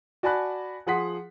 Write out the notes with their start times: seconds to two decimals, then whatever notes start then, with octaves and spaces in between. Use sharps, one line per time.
0.23 F#4 D5 G#5 A5 B5 F#6
0.87 F3 G#4 F#5 C6 B6